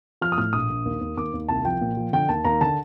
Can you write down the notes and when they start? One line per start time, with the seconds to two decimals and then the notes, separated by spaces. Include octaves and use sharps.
0.21 F3 F6
0.32 D#6
0.38 A2 F6
0.53 A#1 D#6
0.70 A#1
0.85 D#2
1.01 D#2
1.17 D#2 D6
1.34 D#2
1.49 C2 A5
1.65 F3 G5
1.81 A#2
1.97 F3
2.13 D3 G5
2.29 D#2 A5
2.45 D#2 A#5
2.61 D3 A5